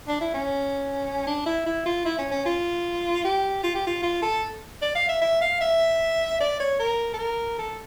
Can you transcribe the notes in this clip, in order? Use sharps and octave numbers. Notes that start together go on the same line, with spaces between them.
D4
E4
C#4
D4
E4
E4
F4
E4
C#4
C#4
F4
G4
F4
G4
F4
F4
A4
D5
F5
E5
E5
F5
E5
D5
C#5
A#4
A4
A#4
A4